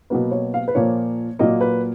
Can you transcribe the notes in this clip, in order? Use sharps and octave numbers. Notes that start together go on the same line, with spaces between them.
B2 F#3 A#3 B4
C#5
F5
B4
A#2 F3 A#3 C#5
A#2 F#3 A#3 D#5
B4